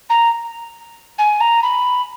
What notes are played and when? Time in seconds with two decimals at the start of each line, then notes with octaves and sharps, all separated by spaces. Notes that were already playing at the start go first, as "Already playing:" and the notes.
0.09 A#5
1.18 G#5
1.40 A#5
1.62 B5